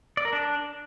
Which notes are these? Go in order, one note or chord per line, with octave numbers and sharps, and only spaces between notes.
D5
A#4
D4